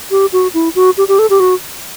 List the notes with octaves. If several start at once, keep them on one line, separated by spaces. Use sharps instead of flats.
G4
F#4
E4
F#4
G4
G4
A4
G4
F#4